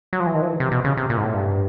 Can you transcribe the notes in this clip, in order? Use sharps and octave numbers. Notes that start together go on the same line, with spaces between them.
F#3
F3
E3
D#3
F3
E3
C3
B2
C#3
C3
A#2
G#2
A2
G2